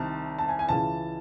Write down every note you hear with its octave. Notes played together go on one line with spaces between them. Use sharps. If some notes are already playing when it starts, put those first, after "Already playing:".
Already playing: C2 C3 D#3 A5
A5
G#5
G#5
C#2 C#3 E3 A5